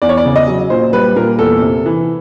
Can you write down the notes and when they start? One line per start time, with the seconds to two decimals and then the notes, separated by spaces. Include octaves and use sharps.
0.02 E2 D5
0.09 C#5
0.17 D5
0.25 C#3
0.36 D#5
0.48 F#3
0.70 A#2 C5
0.93 G3 B4
1.16 A#2 A#4
1.39 E2 A4
1.62 C3
1.86 E3